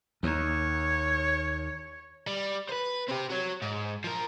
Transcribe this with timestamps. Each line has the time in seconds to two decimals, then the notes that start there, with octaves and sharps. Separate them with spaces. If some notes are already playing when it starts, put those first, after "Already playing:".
0.23 D#2 C#5
2.27 G3
2.69 B4 C5
3.08 C4 G4
3.29 F#4 C#5
3.62 G#2
4.04 F3 A#4